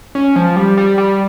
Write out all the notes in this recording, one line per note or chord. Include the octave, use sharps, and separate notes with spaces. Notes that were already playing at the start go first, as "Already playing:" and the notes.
C#4
F3
G3
G3
G3